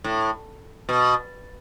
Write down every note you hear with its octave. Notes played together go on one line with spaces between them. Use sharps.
A2
B2